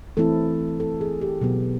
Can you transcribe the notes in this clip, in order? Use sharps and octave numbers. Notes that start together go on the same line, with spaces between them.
E3 A3 C4 E4 A4
A4
G#4
G4
B2 F#3 B3